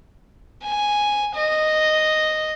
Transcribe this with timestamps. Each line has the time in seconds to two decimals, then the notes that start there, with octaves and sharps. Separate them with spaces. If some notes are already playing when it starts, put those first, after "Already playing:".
0.64 G#5
1.35 D#5